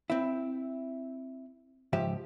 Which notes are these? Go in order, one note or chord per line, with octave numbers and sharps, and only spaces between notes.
C4 E4
C#2 G#2 F3 G4 E5